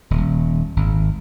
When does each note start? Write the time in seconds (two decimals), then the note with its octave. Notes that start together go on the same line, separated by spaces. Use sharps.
0.10 D#1
0.76 G#1